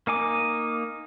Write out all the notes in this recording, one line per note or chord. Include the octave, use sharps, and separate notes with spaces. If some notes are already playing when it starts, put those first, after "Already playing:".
A#3 D#4 G#5 D6